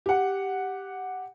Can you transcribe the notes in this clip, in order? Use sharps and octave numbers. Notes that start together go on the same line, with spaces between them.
G4 F#5